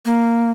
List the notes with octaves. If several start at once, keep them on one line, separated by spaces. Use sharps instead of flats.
A#3